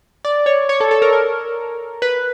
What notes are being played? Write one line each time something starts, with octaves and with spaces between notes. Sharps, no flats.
D5
C#5
C#5
A4
A4
A#4
A#4
B4